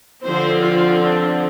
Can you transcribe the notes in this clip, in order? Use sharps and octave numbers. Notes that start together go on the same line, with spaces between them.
D3 F3 C4 C5
F4
D4